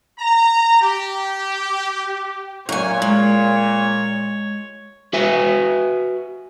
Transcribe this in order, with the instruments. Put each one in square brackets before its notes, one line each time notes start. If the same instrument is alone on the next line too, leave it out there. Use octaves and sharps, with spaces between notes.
[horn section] A#5
G4
[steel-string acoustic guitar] F#2 G#5 [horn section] A#2 [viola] C#5
[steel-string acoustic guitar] G#3
[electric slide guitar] F#4 B4 E5 G#5